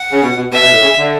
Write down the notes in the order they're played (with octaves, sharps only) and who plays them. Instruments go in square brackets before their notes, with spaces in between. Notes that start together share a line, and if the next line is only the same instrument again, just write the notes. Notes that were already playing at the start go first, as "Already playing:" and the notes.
Already playing: [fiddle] F#5
[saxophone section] C#3
B2
B2
[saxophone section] B2 [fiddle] E5
[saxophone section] B2
A2
C#3
D3